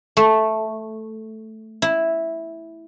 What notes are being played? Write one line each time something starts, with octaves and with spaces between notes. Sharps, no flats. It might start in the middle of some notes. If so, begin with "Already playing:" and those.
A3
E4